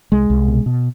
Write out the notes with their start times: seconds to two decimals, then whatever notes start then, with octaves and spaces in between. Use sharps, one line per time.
0.12 C2 G#3
0.30 C2
0.48 B2
0.66 B2